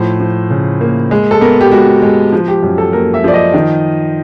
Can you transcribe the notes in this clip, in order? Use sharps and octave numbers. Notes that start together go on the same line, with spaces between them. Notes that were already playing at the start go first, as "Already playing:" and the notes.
Already playing: A2 F3 C5
F3
C#3
A#3
G#3
A4
B3 A#4
G4
G#3 F#4
G#3
F3
G4
F#2
A4
A#3 A#4
E5
F3 D5
D#5
D#3